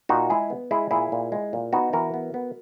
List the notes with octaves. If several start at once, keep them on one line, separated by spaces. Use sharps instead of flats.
A#2 D#4 F#4
G#3 E4 G#4
B3
G#3 E4 G#4
A#2 E4 G#4
A#2
G#3
A#2
B3 D#4 F#4
E3 F#4 A#4
B3
B3